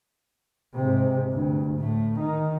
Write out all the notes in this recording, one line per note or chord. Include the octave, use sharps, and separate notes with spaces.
G#2 C3
D2 G2
A2 A3
D#3 D#4